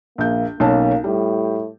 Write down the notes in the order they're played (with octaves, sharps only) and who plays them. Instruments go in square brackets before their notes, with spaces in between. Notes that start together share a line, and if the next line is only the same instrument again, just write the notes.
[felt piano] A#1 G6 [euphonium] A#3
[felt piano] B1 C#4 A5 [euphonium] A#3
[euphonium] A2 [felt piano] G3